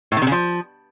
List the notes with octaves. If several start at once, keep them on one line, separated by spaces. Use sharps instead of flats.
A2
D#3
C3
C#3
F3